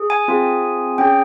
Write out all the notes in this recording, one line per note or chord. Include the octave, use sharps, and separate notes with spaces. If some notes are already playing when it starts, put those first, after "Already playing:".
Already playing: G#4
G#5
C4 F4 G#4
C#4 G#4 G5